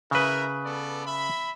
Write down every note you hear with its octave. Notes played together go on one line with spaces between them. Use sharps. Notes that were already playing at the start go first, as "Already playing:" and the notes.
C#3 E4 A#4 B4 E5
B3 A4 D5
E5 B5